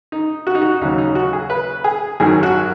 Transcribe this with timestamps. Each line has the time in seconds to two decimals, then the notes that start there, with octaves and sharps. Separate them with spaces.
0.12 D#4
0.47 F#4
0.55 D#4
0.62 F#4
0.81 D#2 C#3 F#3 D#4
0.98 D#4
1.15 F#4
1.33 G#4
1.50 B4
1.84 G#4
2.20 G#1 F#2 D#3 F#3 G#4
2.43 F#4